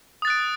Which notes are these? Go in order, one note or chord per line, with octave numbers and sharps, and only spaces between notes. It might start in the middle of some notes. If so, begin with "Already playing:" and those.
D#6 F#6 A6 D7